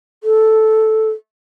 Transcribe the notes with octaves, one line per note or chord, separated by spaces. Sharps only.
A4